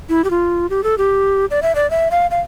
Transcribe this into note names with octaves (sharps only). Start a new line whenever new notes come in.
E4
G4
F4
G4
A4
G4
D5
E5
D5
E5
F5
F5